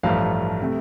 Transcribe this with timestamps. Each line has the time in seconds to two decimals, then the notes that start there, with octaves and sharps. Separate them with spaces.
0.03 A1 G2 F3 A3 F5
0.62 C3 A3